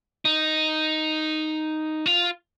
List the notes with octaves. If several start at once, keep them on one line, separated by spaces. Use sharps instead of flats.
D#4
F4